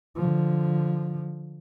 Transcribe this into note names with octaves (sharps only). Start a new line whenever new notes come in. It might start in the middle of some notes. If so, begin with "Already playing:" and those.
D3 F3